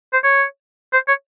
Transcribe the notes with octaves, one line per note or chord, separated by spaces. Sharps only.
C5
C#5
C5
C#5